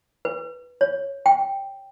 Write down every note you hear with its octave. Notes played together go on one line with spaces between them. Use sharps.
B4
C#5
G5